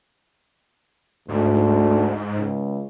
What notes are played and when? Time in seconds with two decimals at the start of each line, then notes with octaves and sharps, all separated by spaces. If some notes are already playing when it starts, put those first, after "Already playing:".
1.28 D2 G#2
2.36 C#2